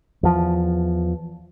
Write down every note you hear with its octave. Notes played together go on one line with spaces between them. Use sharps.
E2 F3